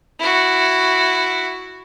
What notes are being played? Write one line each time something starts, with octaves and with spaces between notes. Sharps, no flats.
E4 F#4